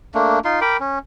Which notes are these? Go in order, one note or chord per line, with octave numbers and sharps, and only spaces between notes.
A3 A#3 D4
D#4 F4 C6
A#4 G5 B5 D6
C#4